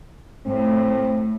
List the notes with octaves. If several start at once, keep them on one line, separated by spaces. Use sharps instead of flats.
A2 C4